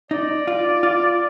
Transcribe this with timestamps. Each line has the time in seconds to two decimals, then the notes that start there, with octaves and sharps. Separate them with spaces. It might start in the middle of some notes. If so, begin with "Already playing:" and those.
0.11 D#4 D5
0.47 F4
0.83 F4